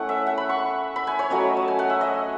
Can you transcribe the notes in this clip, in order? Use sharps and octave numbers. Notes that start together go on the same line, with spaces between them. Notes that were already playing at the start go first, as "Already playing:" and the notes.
Already playing: A3 C#4 E4 F#5
E5
F#5
B5
C#6
B5
G#5
C#5
F#3 A3 C#4 D#5
A5
G#5
F#5
E5
D#5